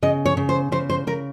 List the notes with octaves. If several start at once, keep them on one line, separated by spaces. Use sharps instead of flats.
C#3 D#5
C#5
C#3
C5
C#3 C5
C5
C#3 A#4